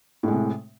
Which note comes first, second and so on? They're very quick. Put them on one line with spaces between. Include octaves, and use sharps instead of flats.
A2 G#3 C3